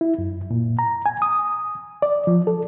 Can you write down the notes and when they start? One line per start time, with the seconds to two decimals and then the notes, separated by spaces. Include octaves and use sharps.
0.01 E4
0.19 F#2
0.51 A#2
0.79 A#5
1.06 G#5
1.22 D#6
2.02 D5
2.27 F3
2.47 A4